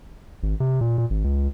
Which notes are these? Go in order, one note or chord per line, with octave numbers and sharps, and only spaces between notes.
G#1
C3
A#2
A#2
G#1
C#2